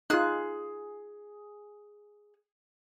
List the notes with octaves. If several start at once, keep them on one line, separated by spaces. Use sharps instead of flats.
D#4 F4 G#4 F#6